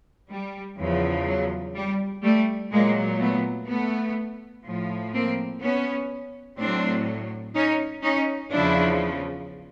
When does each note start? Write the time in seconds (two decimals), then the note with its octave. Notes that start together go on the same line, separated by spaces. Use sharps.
0.30 G3
0.78 E2 C#3 F3
1.26 F#3
1.75 G3
2.23 G3 A3
2.71 A#2 F#3 G#3 A#3
3.19 A3 B3
3.68 A3 B3
4.64 A2 F3
5.14 A#3 C4
5.61 B3 C#4
6.58 A2 F#3 C4 D4
7.55 C#4 D#4
8.03 C#4 D#4
8.52 E2 C#3 F3 D4 E4